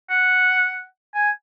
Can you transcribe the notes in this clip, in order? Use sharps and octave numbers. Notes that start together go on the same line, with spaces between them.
F#5
G#5